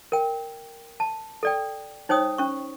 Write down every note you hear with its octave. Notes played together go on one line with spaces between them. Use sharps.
A#4 G5
A5
A4 D5 G5
D#4 C5 C#5 G5 D#6
C#4 C#6